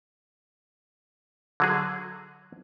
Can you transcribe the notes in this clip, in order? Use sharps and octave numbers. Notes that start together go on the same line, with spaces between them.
D3 F#3 G#4